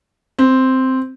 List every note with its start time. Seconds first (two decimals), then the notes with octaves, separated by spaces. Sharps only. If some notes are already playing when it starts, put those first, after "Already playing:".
0.39 C4